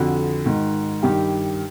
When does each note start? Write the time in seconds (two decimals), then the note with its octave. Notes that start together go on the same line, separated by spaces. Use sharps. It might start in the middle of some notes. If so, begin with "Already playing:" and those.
Already playing: F2 D3 F#4
0.46 G#2 D#3
1.03 G2 D#3 G4